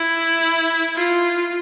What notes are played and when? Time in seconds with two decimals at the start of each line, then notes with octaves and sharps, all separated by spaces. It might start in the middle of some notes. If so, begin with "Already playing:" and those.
Already playing: E4
0.96 F4